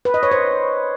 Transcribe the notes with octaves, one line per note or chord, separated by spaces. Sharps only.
B4
D#5
C#5
C5